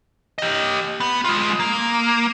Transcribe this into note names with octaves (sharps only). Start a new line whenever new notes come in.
G4 D#5
B3
G#3 F4
A#3